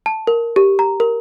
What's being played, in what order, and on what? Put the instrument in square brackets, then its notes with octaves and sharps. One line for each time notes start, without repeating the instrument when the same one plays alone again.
[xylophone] A5
A#4
G4
A#5
A#4